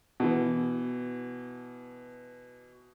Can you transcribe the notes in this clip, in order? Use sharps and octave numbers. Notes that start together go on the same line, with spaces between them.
B2 E3